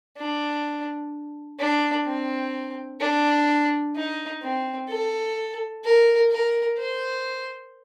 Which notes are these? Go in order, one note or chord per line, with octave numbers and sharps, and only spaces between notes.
D4
D4
C4
D4
D#4
C4
A4
A#4
A#4
C5